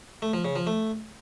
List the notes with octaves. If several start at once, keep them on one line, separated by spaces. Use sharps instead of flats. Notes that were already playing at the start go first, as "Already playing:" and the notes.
A3
F3
C#3
F3
A3